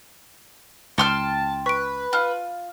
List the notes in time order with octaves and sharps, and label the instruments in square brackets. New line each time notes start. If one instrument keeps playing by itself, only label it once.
[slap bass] C#2 [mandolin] G5 C6 F6 [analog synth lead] A5 [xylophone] C#7 F7
[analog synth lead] B4 [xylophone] C#6 D7
[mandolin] F4 [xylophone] B5 F6 F#6